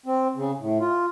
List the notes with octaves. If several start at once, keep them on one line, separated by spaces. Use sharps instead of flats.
C4
C#3
A2
F4